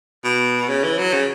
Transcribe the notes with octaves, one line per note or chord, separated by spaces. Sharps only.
B2
C#3
E3
F#3
C#3